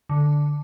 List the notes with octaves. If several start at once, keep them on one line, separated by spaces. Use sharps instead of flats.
D3